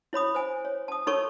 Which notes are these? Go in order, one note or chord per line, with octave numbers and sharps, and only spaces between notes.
E4 C#5 B5 D#6
C5 G#5
C#5
A5 D#6
D#4 A4 A#4 C#5 A5 C#6